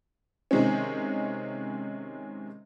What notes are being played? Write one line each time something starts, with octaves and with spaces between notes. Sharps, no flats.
C3 D#3 G#3 C4 C#4